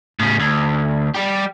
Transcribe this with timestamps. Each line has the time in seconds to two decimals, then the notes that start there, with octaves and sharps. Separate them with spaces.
0.20 A2 C#3
0.40 D2
1.14 G3 G4